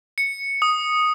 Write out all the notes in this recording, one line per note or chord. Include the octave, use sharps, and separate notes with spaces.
C#7
D#6